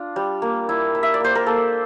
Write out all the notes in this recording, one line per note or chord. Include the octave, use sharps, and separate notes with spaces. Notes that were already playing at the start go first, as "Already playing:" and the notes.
Already playing: D4 F4
G3
A#3
E4
E4
E5
D5
A#3 C5
A#4
A#3 A4